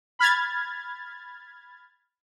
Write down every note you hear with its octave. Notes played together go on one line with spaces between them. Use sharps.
B5 F6 G#6 A6